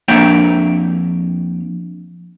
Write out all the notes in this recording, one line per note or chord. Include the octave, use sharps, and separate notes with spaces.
F2 A#3 D4 C#5 E5 G5